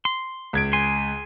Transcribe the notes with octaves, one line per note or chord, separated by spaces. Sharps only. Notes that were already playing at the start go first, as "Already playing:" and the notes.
C6
C#2 G#6 D7
G#5 C6